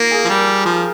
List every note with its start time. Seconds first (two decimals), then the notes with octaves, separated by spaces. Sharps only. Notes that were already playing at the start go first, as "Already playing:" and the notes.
Already playing: A#3 D#4 F4
0.11 G#4
0.25 F3
0.29 G3 A#4
0.66 F3